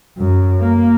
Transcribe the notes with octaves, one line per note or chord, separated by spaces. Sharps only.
F#2
A#3